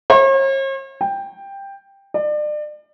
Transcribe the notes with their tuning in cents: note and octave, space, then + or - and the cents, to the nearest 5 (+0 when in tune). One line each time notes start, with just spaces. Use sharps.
C#5 -45
G5 +10
D5 +35